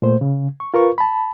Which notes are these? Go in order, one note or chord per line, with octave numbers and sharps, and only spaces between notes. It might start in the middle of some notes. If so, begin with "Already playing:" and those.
A#2 A3 C5
C#3
C#6
F4 A#4 B4 C#6
A5 B5